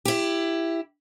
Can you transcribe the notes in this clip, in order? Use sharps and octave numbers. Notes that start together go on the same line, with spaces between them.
E4 G4